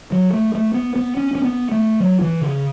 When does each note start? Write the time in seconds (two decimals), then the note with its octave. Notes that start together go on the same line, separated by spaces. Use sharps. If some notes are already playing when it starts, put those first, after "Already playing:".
0.12 F#3
0.33 A3
0.55 A3
0.74 B3
0.96 B3
1.17 C#4
1.35 C#4
1.44 B3
1.71 A3
2.00 F#3
2.21 E3
2.41 C#3